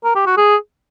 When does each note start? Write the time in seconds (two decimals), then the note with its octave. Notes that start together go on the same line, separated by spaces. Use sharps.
0.04 A#4
0.15 G4
0.26 F#4
0.37 G#4